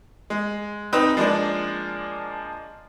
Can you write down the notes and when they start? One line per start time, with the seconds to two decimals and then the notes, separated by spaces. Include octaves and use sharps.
0.30 G#3
0.92 F1 C4 D#4 B4 F#6
1.17 F3 G#3 A#3 D4